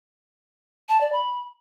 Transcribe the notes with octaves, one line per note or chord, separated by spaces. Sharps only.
A5
D5
B5